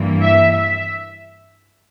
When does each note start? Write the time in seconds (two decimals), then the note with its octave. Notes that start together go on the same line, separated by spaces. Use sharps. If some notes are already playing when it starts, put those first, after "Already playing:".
Already playing: G2 E3 A#3
0.21 E5
0.53 E5